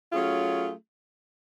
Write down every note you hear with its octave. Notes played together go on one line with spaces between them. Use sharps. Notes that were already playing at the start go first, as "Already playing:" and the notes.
F#3 A3 C#4 F4 G#4